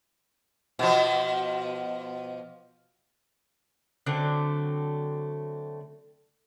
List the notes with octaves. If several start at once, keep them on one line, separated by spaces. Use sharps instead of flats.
B2 F3
D3 F#3 A3 C4